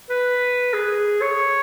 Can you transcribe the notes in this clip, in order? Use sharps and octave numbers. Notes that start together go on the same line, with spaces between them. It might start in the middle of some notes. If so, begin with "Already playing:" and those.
B4
G#4
C#5